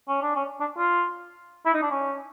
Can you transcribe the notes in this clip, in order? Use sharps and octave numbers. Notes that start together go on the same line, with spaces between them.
C#4
D4
C#4
D4
F4
E4
D#4
D4
C#4